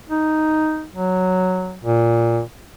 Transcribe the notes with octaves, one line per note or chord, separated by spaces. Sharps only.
D#4
F#3
A#2